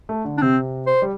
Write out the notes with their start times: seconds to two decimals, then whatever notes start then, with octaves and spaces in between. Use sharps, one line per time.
0.09 A3
0.25 D3
0.38 D4
0.42 C3 C4
0.86 C5
1.02 G3